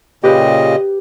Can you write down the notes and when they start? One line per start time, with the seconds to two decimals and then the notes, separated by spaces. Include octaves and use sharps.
0.24 A#2 C#3 G4 B4 D#5